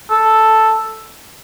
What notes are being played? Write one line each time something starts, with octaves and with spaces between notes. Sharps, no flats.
A4